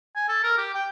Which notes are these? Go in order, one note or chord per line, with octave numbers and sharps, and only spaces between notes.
G#5
A4
A#4
G4
G5